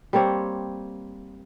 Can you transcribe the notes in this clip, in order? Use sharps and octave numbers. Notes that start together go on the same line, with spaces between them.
G3 A#3 C4 C#5